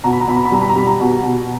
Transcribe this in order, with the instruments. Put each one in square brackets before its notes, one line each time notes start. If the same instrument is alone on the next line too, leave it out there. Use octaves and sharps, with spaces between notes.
[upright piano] B2 A#5
B5
A#5
B2 B5
A#5
B5
G3 A#5
B5
A#5
G3 B5
A#5
B2
B2